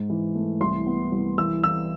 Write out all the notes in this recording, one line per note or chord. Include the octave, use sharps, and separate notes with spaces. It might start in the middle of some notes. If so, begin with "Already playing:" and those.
Already playing: G#2
E3
A3
C2 C6
B3
C2
E3 E6
E3 E6